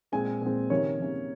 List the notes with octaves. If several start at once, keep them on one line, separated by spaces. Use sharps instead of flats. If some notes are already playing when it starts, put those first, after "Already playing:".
A#2 G#3 C4 G#5
A#2 G#3 C4
C3 D#3 A#3 C#4 C#5
C3 D#3 A#3 C#4